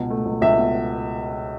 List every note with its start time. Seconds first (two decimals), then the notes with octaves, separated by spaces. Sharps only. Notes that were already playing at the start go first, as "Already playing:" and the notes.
Already playing: C#2 B2
0.10 A3
0.26 C#2
0.42 C#2 E5
0.58 B2